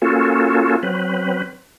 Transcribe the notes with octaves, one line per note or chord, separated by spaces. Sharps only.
A#3 C#4 F4 F#4 A4
F#3 C4 B4